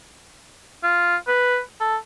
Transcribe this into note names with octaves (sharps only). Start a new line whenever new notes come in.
F4
B4
A4